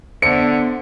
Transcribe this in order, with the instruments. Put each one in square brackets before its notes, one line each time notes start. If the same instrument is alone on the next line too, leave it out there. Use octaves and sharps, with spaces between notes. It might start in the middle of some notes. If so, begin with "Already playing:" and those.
[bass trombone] D3 [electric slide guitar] B3 E5 [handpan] C5 [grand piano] C#7